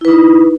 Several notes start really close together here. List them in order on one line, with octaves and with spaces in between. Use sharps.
E4 B4 D#4